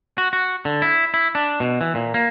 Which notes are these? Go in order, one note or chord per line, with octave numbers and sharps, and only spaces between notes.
F#4
F#4
D3
E4
E4
D4
B2
E3
A#2
A#3